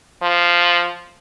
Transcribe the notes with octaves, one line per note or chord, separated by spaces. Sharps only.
F3